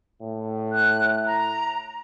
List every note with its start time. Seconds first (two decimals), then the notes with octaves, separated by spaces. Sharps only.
0.21 A2
0.72 F#6
1.26 A#5